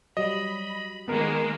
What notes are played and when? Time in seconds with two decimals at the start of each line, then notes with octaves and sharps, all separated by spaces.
0.17 F#3 G3 D#5 B5
1.08 D#3 G#3 A#3 B3 A#4